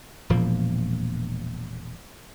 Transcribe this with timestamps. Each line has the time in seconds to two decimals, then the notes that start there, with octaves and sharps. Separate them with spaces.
0.30 E1 A#2 F3 A#3